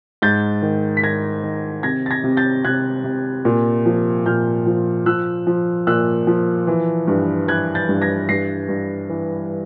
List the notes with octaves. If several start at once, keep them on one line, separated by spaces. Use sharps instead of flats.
G#2 G6 A6
D#3
B6
D#3 G#6 A#6
D#3
C3 G#6 A#6
A6
G#6 A#6
C3
G6 A6
C3 F#6 G#6
C3
A#2
F3
A#2 F6 G6
F3
F3 E6 F#6
F3
A#2 E6 F#6
F3
E3
G2
E3 F#6 G#6
G6 A6
G2
G#6 A#6
G2 A#6 C7
G2
E3